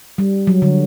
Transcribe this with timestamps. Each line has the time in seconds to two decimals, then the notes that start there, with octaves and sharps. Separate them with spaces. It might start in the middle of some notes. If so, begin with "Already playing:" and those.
0.18 G3
0.47 F#3
0.62 D3